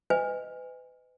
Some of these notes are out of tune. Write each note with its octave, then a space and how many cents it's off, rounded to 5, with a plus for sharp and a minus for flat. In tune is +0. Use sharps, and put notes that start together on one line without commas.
B4 +35 D#5 +0 G#5 -20